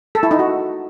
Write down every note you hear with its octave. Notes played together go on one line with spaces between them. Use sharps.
A4
E4
D#4
F#4